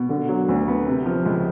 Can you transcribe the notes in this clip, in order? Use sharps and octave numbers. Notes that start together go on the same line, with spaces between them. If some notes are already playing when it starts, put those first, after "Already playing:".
Already playing: B2
D3
F#3
D2
B3
C3
F3
C#2